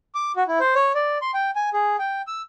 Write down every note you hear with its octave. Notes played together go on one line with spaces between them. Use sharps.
D6
F#4
E4
C5
C#5
D5
C6
G5
G#5
G#4
G5
E6